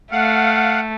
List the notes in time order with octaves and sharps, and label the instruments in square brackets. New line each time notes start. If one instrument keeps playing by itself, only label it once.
[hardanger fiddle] A3 [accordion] F5 F#5